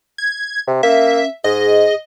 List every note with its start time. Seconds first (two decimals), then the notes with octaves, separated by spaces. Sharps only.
0.18 G#6
0.67 C3
0.83 A#3 C#4 E5
1.44 G#2 G#4 D#5